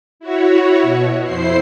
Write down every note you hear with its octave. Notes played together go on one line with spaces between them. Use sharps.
E4 F#4 C#5
B2
F2 E4 C5 C7